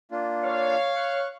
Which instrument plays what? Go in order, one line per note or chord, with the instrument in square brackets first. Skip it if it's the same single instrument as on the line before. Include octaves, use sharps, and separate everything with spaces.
[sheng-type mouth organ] A#3 D4 F4
[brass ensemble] C#5 F5
[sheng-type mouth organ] C#6 F#6